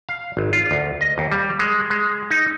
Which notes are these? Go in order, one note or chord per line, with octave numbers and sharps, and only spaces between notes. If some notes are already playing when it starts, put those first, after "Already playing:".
F5
G#1
F4
D2
D#5
D#2
G3
G#3
G#3
D#4